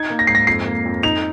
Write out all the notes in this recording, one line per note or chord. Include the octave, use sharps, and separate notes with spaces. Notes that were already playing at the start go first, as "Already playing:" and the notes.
Already playing: D#4 G#6
A#3
A#6
G#2 C7
A#6
F2 C7
A#3
F2
D#4 F7